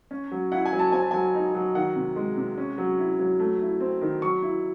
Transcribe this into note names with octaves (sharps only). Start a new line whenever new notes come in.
C#4
F#3
E4 F#5
G#5
F#3
A5
C4 G#5
A5
F#3 G#5
D#4
F#3
D#3 F#5
C3
G#3
C3
C#4
F#3
E4
F#3
A3
E4
C4
D#3
F#3 C#6
E4